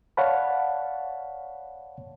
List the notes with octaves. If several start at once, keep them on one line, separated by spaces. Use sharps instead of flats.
C#5 D5 F5 F#5 A5 B5